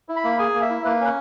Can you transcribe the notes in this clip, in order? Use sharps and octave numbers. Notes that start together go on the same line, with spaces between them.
E4
B5
A#3
G#4 G#5
A#3
E5
E4
A#3 B4
C#4